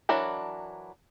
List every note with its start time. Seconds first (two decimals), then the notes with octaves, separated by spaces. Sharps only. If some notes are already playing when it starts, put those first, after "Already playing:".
0.09 E3 F#3 D4 A#4